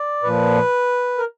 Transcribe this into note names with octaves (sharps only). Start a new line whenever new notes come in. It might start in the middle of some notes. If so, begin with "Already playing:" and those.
Already playing: D5
A#2 F3 B4
A#4